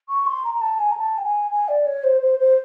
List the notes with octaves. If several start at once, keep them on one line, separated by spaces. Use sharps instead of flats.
C#6
C6
A#5
A#5
A5
G#5
A#5
A5
G5
G#5
G#5
D5
C#5
C5
C5
C5